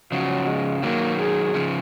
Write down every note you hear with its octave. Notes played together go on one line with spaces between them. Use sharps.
C#3 F3 F#3
G#3
D#3 F#3 A#3
G#4
C#3 F3